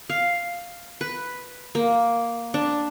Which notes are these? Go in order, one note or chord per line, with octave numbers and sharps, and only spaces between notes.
F5
B4
A#3
D4